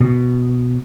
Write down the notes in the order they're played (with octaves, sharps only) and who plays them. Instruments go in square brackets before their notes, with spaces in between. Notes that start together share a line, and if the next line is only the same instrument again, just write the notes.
[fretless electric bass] B2